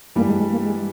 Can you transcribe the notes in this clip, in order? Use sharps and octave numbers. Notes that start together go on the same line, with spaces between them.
G2 E3 G3 A#3
G#3
G#3
A#3
G#3